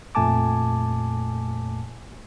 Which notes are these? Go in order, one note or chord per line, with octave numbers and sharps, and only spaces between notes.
F2 A#2 A3 G#5 A5 D6